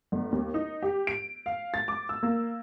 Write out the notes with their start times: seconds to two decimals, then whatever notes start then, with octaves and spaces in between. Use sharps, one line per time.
0.12 G1
0.32 D#2
0.54 D#4
0.83 G4
1.07 D7
1.46 F5
1.74 A6
1.88 D6
2.09 E6
2.23 A#3